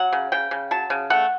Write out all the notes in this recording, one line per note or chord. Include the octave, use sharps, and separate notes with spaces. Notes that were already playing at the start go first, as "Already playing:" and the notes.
Already playing: F#3 F#5
C#3
C#3 G5
C#3
F#3 A5
C#3
A3 F#5